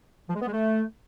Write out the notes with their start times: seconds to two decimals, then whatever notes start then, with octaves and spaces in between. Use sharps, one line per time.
0.29 F3
0.35 G#3
0.41 B3
0.46 G#3
0.52 A3